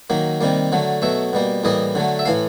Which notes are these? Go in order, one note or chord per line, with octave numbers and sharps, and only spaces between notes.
D#3 F#3 A#3
C3 D#3 G3 A#3
D3 F#3 A3
B2 F#3 A3 E5
B2 G3 A#3
A2 E3 G3 A#3 D#5
D3 F#3 A3
E5
A2 E3 A3 F5